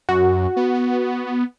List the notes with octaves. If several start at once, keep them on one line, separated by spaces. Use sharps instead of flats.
F#2 F#4
B3